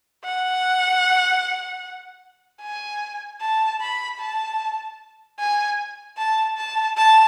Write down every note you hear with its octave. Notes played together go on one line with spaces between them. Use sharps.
F#5
G#5
A5
B5
A5
G#5
A5
A5
A5